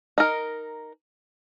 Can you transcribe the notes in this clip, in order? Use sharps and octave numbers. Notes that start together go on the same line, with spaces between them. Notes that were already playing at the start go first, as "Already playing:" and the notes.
D#4 A#4